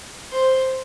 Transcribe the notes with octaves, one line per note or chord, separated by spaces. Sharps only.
C5